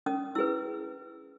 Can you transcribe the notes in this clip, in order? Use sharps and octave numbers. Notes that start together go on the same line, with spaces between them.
C#4 D#6
E4 G#4 B4 E6